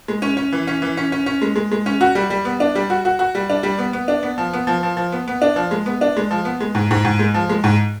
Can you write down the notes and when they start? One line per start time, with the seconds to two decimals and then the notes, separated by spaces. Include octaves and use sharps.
0.08 G#3
0.22 C#4
0.37 C#4
0.52 E3
0.67 C#4
0.82 E3
0.97 C#4
1.12 C#4
1.26 C#4
1.42 G#3
1.56 G#3
1.72 G#3
1.86 C#4
2.01 F#4
2.15 G3
2.30 G3
2.45 B3
2.60 D4
2.75 G3
2.90 F#4
3.05 F#4
3.19 F#4
3.35 G3
3.50 D4
3.63 G3
3.78 B3
3.93 B3
4.08 D4
4.23 B3
4.38 F3
4.53 B3
4.67 F3
4.83 F3
4.97 F3
5.12 B3
5.28 B3
5.42 D4
5.56 F3
5.71 G#3
5.86 B3
6.01 D4
6.17 G#3
6.31 F3
6.45 B3
6.61 G#3
6.75 G#2
6.91 G#2
7.05 G#2
7.19 G#3
7.34 F3
7.49 G#3
7.64 G#2